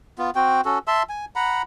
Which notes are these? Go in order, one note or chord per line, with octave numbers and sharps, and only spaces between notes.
B3 F4
C4 F#4 G5
C#4 F#4 A4
E5 A5 C6 E6
G#5
F#5 A#5 B5